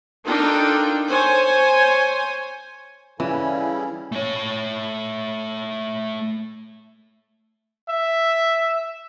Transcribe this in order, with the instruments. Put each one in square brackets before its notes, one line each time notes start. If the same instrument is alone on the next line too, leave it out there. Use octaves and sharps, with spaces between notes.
[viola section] D4 D#4 F4 A4 A#4 G5
C5 C#5 G#5
[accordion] C#3 G3 E4 [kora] E3 [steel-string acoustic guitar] C#4 [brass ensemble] A4 F5 G#5
[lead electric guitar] A3 C#5
[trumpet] E5